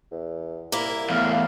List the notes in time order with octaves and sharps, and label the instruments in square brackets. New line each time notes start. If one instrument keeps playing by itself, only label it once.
[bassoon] E2
[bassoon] C2 [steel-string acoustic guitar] A#3 E4
[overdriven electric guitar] E2 A2 [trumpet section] F5